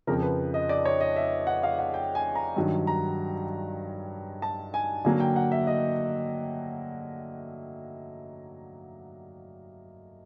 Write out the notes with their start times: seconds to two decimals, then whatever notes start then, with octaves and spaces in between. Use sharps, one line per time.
0.07 F2 C#3 F3 A#4
0.22 B4
0.54 D#5
0.69 D5
0.85 C#5
1.01 D#5
1.16 E5
1.47 F#5
1.63 F5
1.79 F#5
1.94 G5
2.15 G#5
2.35 A#5
2.56 G2 D#3 F#3
2.87 A#5
4.42 A5
4.74 G#5
5.05 D3 F#3 A#3 G#5
5.20 G5
5.36 F#5
5.52 E5
5.67 D#5